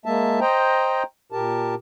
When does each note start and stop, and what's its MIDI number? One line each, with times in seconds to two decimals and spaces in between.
0.06 0.40 56
0.06 0.40 58
0.06 0.40 76
0.06 0.40 81
0.41 1.03 72
0.41 1.03 75
0.41 1.03 79
0.41 1.03 82
1.32 1.75 46
1.32 1.75 67
1.32 1.75 70
1.32 1.75 81